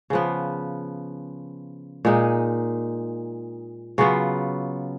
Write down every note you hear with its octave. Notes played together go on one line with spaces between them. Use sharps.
C#3 F3 B3
A#2 G#3 D#4
C#3 F#3 B3 F4